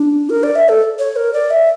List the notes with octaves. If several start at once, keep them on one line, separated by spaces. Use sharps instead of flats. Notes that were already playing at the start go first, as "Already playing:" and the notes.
Already playing: D4
A#4
D5
E5
A4
C#5
A#4
D5
E5